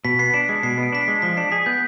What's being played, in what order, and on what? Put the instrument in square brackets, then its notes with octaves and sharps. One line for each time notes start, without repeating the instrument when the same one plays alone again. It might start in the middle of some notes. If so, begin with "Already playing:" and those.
[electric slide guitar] B2 [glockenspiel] B6
[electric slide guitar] B3 [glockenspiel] C7
[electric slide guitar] D4 [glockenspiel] D7
[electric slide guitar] G#3 [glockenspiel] D7
[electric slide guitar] B2 [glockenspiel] C7
[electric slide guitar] B3
[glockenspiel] D7
[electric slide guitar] D4 [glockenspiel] B6
[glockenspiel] C7
[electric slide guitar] G#3
[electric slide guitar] F3 [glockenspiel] B6
[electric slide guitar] D4 [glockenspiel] C7
[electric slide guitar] G#4 [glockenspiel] B6
[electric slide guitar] B3 [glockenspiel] G6